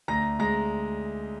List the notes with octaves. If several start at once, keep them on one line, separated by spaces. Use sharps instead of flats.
D2 A#5 A#6
G#3 A#5 A#6